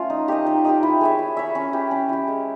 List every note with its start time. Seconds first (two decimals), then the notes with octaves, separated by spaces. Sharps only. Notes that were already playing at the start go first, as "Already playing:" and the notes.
Already playing: A3 C#4 F4
0.10 D#4
0.28 G4 A#4 D#5
0.46 D#4
0.65 G4 A#4 D#5
0.83 E4
1.01 G#4 C#5 E5
1.19 E4
1.37 G#4 C#5 E5
1.55 C#4
1.73 E4 G4
1.91 C#4
2.09 E4 G4
2.28 G#3